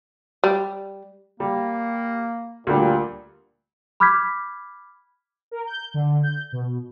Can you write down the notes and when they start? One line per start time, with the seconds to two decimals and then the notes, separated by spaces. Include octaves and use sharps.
0.44 G3
1.40 G3 A#3
2.67 D2 A#2 G3
4.00 B5 D6 F6 G6 G#6 B6
5.51 A#4
5.67 G6
5.94 D3
6.23 G6
6.52 B2